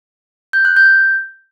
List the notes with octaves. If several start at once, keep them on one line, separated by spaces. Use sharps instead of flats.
G6
F#6
G6